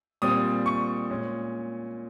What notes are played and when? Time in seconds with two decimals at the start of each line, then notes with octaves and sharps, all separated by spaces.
0.22 A#2 G3 C4 D#6
0.66 C#6
1.10 A#2 G#3 C#4